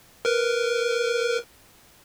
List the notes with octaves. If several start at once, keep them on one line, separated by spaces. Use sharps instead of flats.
A#4 B4